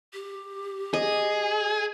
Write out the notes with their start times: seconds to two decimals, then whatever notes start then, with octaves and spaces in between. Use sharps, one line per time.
0.14 G4
0.94 G#4 D#5